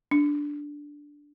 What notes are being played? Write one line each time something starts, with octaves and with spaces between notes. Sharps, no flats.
D4